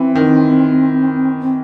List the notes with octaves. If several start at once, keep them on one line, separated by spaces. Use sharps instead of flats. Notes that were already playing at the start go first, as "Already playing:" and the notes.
Already playing: E3 C4
D#3
C4